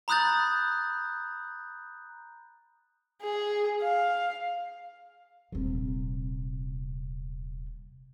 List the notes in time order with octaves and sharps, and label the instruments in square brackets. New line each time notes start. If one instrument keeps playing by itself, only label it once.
[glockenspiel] A#5 B5 D#6 F#6 G6 A6
[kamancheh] G#4
F5
[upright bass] D#1 C3